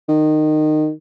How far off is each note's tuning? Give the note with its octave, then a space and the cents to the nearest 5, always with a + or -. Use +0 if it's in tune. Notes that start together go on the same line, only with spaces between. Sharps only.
D#3 -20